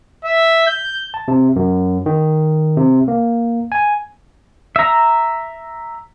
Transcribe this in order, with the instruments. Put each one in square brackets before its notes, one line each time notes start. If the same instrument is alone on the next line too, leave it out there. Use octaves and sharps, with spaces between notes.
[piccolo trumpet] E5
G6
[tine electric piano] A5
C3
F#2
D#3
C3
A#3
G#5
[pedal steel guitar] E5 A#5